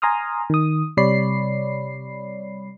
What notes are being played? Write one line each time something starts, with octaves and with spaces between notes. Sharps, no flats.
G#5 A#5 C6 D#6 F6
D#3 D#6
C3 G3 C#5 D5 B5 C7